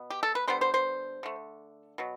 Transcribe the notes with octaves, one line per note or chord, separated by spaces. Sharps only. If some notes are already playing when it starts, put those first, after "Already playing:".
Already playing: B2 B3
G4
A4
B4
D3 G3 B3 C5
C5
C5
D3 A3
B2 F#3